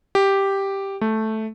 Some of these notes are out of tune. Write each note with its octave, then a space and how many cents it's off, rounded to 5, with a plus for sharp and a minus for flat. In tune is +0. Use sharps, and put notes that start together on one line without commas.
G4 +0
A3 -5